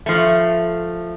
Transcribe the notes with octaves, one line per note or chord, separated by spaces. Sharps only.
F3 A3